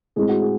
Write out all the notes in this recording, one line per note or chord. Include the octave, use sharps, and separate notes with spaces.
A2 G#3 C4 G#4
F#4
G#4